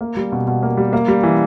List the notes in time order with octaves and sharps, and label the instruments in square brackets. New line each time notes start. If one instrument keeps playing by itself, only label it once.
[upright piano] A#3
G3
B2
B2
A#3
G3
A#3
G3
E3